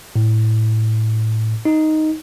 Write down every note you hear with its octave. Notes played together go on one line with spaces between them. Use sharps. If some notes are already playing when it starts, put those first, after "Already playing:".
A2
D#4